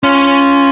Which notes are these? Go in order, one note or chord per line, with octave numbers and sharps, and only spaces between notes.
C#4 F4